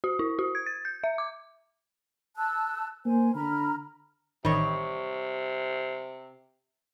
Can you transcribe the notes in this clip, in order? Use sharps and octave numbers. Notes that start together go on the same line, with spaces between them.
F#4
E4
F#4
G#6
A6
G6
E5
D6
A5 E6 F#6
A#3 C5 G#5
D3 A#5 B5 F6
A1 C3 D#3 G3 C#5 D#5